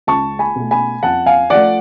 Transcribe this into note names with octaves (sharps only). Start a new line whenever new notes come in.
C#2 A5 C#6
G#5 B5
B2 A3
G#5 B5
F2 F#5 A5
F5 G#5
F3 A3 D5 F#5